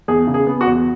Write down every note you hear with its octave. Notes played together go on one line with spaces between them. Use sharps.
E2 G#4
C#3
G#4
B3
F#4
E2